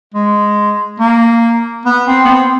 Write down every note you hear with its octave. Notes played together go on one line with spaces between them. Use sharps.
G#3
A#3
B3
C4
B3
C4